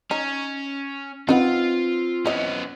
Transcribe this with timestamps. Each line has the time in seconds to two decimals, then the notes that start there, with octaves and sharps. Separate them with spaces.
0.11 C#4 D#4
1.29 C4 D#4 F4 B4 F#5
2.26 E3 B3 C#4 D#5